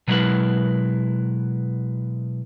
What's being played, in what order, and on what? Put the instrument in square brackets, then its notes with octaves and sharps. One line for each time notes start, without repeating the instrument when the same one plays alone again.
[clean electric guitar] B2 F#3 G#3 E4 A#4 B4